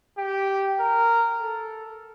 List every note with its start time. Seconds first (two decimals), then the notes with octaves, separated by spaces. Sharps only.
0.18 G4
0.80 A#4
1.41 A4